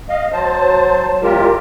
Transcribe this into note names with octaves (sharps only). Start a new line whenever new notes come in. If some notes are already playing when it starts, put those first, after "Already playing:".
D#5 F5
F#3 C5 A5
E2 G#3 F4 G4 A#4